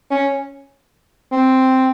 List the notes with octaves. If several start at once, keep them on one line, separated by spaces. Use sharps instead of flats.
C#4
C4